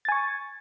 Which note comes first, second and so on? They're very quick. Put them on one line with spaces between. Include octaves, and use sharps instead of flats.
A6 G#5 C#6